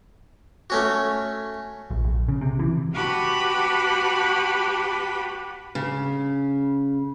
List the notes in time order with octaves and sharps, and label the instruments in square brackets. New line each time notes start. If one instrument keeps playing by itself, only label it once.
[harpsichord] A3 C#4 F#4
[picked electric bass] A#1
A#1
C#3
C3
E3
[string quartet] F#4 G4 B4 G5 A5 B5
[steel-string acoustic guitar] C#3